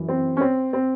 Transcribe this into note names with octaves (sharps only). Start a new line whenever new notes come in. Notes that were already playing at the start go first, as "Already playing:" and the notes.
Already playing: F#2 E3
C4
C#4
C4
C4